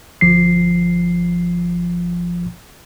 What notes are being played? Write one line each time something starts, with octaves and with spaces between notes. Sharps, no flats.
G1 F3 C7